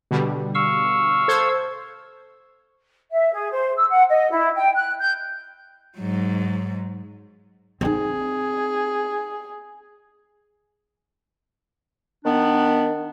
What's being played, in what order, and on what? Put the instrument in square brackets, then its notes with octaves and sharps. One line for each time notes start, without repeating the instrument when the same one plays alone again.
[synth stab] B2 D3 G3
[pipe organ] F5 C#6 E6
[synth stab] A4 C5 G#6
[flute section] E5
G#4
C5
E6
F#5
D#5
E4
G5
F#6
G6
[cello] G#2 F#3
[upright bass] C4 D#4 [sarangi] G#4
[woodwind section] D#3 B3 D4